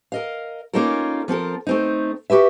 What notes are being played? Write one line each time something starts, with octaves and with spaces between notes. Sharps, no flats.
A#4 D#5 F5
A#3 C#4 D#4 F4 A4 A#4
F3 C4 A4 A#4
A3 C4 D#4
F#4 G4 B4 E5